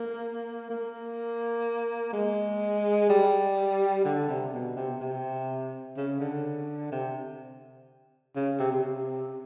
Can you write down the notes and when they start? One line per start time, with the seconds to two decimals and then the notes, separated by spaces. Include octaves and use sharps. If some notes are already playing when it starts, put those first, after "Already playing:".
Already playing: A#3
0.70 A#3
2.13 G#3
3.09 G3
4.05 D3
4.29 C3
4.53 B2
4.77 C3
5.01 C3
5.97 C#3
6.20 D3
6.92 C3
8.36 C#3
8.60 C3
8.72 C3